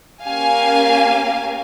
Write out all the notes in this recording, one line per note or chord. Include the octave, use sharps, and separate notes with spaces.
A#3 C#4 G4 F5 G#5